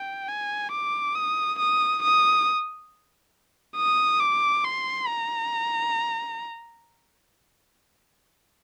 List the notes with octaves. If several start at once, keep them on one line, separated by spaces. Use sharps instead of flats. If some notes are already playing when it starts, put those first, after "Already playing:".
Already playing: G5
G#5
D6
D#6
D#6
D#6
D#6
D6
C6
A#5